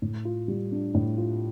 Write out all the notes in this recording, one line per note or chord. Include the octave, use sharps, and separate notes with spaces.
A2
F4
G3
D4
A2
F4